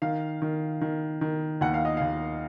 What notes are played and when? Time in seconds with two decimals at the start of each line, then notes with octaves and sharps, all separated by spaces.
0.02 D#3 F5
0.42 D#3
0.81 D#3
1.21 D#3
1.61 D#2 F#5
1.74 F5
1.85 D#5
1.97 D#2 F5